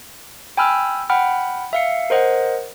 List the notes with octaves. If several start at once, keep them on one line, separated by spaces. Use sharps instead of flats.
G5 G#5 B5 E6 F6
F#5 G5 B5 F6
E5 F5 C#7
A#4 C5 D#5 F#5